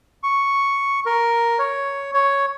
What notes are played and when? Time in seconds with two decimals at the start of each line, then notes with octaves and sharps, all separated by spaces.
0.23 C#6
1.06 A#4
1.59 C#5
2.14 C#5